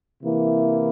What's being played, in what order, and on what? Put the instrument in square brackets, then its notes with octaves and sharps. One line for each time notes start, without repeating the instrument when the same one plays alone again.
[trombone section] C3 E3 A#3 E4